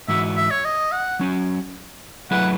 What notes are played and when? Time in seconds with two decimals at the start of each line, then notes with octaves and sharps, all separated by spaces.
0.08 G#2 E3 F#4 E5
0.37 E5
0.50 C#5
0.65 D#5
0.92 F#5
1.19 F#3 C#4 F#4
2.31 F#3 A3 E4 G#4 B4 F#5